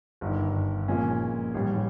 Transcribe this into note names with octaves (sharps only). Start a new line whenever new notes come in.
G1 G2 D#3
A#2 F3 G#3 C#4
A1 G#2 D#3 G3